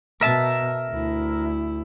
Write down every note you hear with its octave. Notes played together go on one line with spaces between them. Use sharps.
B2 A#4 E5 A5
D2 E4